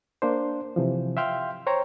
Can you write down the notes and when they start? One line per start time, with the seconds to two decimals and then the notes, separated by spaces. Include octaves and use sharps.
0.22 A#3 D4 C5
0.76 C3 E3 F3
1.17 E5 F5 G5 C6 F6 G6
1.67 C5 C#5 G5 A#5